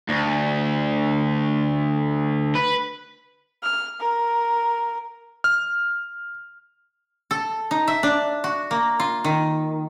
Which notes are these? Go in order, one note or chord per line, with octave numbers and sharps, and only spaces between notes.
D2
B4
F6
A#4
F6
A4
D#4
E5
D4
F#4
A#3
F4
D#3